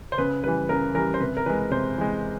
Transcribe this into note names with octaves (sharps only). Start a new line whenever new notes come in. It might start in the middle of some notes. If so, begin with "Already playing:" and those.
C5
C#3 B4
E3 G3 B4
C#3 A#4
E3 G3 A#4
C5
C3 B4
A#4
E3 G#3 B4
C3 C5
E3 G#3